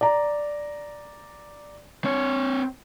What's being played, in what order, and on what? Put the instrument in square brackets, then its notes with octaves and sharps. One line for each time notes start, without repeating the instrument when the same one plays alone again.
[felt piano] D5 A#5
[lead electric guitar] C4 C#5